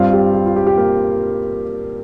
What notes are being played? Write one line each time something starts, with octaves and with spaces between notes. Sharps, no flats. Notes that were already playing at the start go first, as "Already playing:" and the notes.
Already playing: G2 G3 C4 F4 F5
G4
G4
F4
G4
G4
A#3 A#4